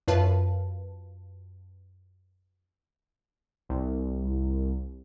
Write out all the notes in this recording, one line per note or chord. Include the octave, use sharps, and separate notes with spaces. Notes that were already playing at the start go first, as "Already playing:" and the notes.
F#2 F4 B4 F5 A5
C2